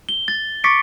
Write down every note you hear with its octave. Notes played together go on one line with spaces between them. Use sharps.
G7
A6
C#6 D6 A6 B6 C#7 D7